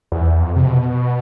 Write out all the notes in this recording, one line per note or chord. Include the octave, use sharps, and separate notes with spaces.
E2
F2
C3
B2